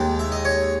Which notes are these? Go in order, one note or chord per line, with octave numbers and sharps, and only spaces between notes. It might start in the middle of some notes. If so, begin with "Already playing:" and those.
Already playing: D#2 D#3 G#3
E5
D#5
C#5